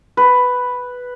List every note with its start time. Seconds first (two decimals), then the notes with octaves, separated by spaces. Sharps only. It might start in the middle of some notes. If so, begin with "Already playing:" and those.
0.17 B4